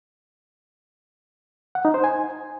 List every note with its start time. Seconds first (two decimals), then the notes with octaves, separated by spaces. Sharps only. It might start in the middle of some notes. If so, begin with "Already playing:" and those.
1.75 F#5
1.85 D#4
1.94 C5
2.04 G#5